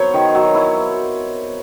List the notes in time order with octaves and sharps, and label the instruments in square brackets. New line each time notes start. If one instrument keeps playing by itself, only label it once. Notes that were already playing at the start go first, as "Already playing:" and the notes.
Already playing: [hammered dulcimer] F#3 B3 [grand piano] C5 C#5
[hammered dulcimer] D#3
F#3
E4